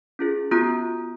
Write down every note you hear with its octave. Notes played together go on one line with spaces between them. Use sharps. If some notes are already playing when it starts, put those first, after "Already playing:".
C#4 F4 G#4
B3 F4 F#4 A#5 D#6 G6